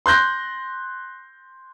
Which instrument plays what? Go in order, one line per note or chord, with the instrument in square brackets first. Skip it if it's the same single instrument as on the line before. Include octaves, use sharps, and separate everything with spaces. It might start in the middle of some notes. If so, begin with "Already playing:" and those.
[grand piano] C6 F#6 G6 A#6